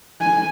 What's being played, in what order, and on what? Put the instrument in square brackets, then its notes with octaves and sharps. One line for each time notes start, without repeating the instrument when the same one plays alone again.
[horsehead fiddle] G#5